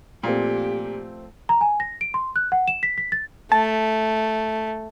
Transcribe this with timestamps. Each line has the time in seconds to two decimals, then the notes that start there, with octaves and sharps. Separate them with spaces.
0.23 A#2 F3 A3 C4 G4
1.49 A#5
1.61 G#5
1.80 A#6
2.01 D7
2.14 C6
2.36 F#6
2.52 F#5
2.68 E7
2.83 B6
2.98 B6
3.12 A6
3.52 A3 A5